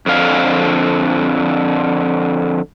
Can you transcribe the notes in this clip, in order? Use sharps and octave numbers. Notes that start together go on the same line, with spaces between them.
F2 D3 F5